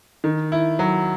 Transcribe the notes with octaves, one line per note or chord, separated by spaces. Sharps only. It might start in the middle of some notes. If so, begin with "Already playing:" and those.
D#3
E4
F#3